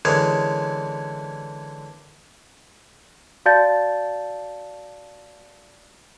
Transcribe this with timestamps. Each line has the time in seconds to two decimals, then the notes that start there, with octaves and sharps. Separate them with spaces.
0.05 D3 E3 G#3 C#4 G#4 A#4
3.46 F#4 D5 F5 A5 G6 A6